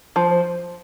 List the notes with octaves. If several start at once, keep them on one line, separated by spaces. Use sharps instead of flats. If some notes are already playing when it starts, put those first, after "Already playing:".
F3 C5
C5